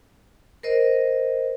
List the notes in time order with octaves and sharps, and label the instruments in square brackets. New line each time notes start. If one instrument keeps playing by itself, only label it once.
[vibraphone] A#4 C5 D#5